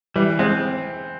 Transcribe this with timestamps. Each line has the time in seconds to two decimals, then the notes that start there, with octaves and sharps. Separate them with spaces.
0.16 E3 G3
0.39 G#3 C4